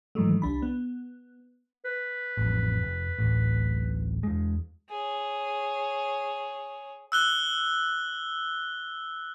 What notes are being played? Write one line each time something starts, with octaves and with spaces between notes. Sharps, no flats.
G#2 D#3 E3 F#3 G#3 A3
C2 D4 B5
B3
B4
A1 F2
F1
D1 A1
E2 G#3
G#4 C#5
E6 F#6 G7